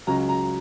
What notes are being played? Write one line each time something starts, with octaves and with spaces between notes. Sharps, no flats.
C#2 C#3 F#3 A#5
A#5